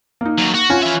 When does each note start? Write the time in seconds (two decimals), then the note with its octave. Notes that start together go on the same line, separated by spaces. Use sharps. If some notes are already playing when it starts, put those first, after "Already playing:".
0.21 A#3 D#4
0.38 D#2 F#3
0.55 F#4
0.70 C#4 F4 G#5
0.83 E3 E5